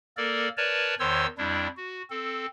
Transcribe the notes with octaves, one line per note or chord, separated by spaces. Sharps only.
A#3 A4 A#4 D5
A#4 B4 C#5 D5 A5
E2 D#3 C5 C#5 C6 E6
F2 G3 D4 E4
F#4
C4 A4